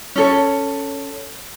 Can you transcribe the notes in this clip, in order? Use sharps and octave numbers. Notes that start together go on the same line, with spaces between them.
C#4 A4 C#5